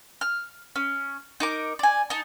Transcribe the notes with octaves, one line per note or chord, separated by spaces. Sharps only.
F6
C#4
D#4 A#4 D6
D5 G#5
D#4 A5